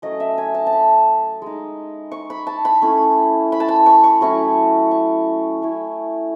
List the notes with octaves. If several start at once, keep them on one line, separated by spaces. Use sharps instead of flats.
F#3 A3 C#4 D#5
E5
G#5
A5
A5
B5
G#3 D#4
C#6
B5
A5
B5
A3 C#4 E4
B5
A5
B5
C#6
C#6
F#3 A3 C#4 E4 C#6
C#6
A3 C#4 E4